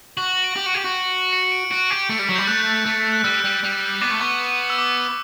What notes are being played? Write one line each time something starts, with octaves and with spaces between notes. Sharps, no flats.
F#4 F#7
F#7
D7
G4
F#4
G4
F#4
C#7
C#7
D7
F#4 D7
G4
A3 C#7
G3 B6
F#3
G6
G3
A3 F#6
A3
F#6
G3 E6
G3
G3
B3 D6
A3
B3 C#6
E6
D6
D6